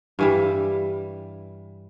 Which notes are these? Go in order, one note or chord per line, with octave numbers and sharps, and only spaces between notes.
G2 E3 G3